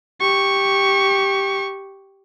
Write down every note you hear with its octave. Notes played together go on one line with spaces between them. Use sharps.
G4 C#6